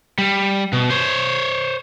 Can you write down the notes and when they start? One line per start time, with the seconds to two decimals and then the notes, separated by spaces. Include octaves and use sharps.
0.18 G3
0.73 B2
0.90 C5 C#5